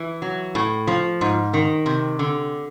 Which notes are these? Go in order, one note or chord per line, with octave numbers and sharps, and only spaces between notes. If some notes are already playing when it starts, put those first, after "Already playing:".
Already playing: E3
F#3
A2
F3
G#2
D#3
C3
D3